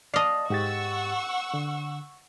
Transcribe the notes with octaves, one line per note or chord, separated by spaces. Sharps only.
D5 D#5 F5 A5
G#2 G4 F#5 C#6 E6 A6
D3